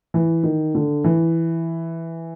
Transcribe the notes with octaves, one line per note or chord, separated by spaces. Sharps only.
E3
D#3
D3
E3